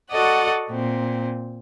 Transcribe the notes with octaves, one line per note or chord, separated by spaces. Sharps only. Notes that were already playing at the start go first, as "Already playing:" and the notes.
F#4 A4 D5 D#5 F#5
A#2 C4